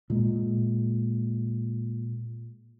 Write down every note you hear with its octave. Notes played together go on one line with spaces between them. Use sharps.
A#2 G#3